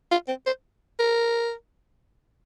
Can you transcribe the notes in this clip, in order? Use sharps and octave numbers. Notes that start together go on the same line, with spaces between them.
F4
C4
C5
A#4